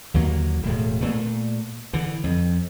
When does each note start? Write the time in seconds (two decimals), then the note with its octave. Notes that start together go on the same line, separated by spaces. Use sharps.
0.14 D#2 D3 F#3 A#3
0.63 E1 A2
1.01 A#2 A3
1.93 D3 E3
2.24 F2